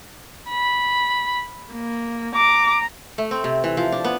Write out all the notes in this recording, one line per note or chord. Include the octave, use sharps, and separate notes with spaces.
B5
A#3
A#5 D6
A3
C4
C3
E3
F3
D4
B3